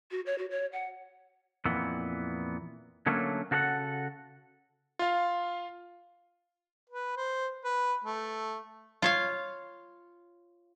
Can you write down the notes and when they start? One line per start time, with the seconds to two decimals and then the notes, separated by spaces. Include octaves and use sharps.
0.11 F#4
0.26 C#5
0.38 F#4
0.51 C#5
0.73 F#5
1.65 F2 A#2 E3 B3
3.06 D3 F#3 A3 A#3 C#4
3.51 C#3 F#4 A4 C#5 F#5
4.99 F4 F5
6.90 B4
7.17 C5
7.64 B4
8.04 A3
9.02 F4 C#5 F5